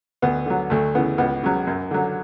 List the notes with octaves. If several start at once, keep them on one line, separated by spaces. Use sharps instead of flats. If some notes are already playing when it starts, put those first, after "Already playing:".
D2 B3
D3 F#3
D2 A3
C#3 E3 B3
C#2 B3
C#3 F#3
F#2
D3 F#3